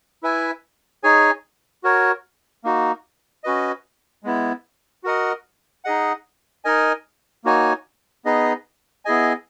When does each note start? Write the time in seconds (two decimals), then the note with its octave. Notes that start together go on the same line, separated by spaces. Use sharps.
0.23 E4 B4 E5 G#5
1.03 D#4 G#4 C#5 G#5
1.84 F#4 A#4 C#5
2.64 A#3 D#4 F#4
3.44 C#4 F#4 B4 D#5
4.23 G#3 B3 E4
5.04 F#4 A#4 D#5 F#5
5.85 D#4 G#4 D#5 F#5
6.65 D#4 A#4 D#5 G#5
7.44 A#3 D#4 F#4 C#5 G#5
8.25 B3 D#4 G#4 B4 D#5
9.05 B3 E4 G#4 D#5 G#5